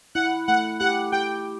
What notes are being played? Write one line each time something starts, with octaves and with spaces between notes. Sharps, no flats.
E4 F#5
A3 F#5
G4 F#5
G4 G5